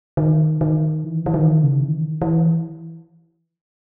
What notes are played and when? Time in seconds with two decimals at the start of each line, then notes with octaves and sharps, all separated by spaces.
0.17 D#3
0.61 D#3
1.04 E3
1.26 E3
1.34 D#3
1.63 C#3
1.81 E3
1.92 D#3
2.22 E3